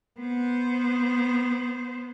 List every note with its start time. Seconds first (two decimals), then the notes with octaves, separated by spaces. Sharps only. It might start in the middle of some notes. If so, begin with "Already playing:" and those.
0.20 B3 C5